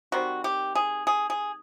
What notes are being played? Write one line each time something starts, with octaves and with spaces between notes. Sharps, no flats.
D#3 G3 C4 F#4
G4
G#4
G#4
G#4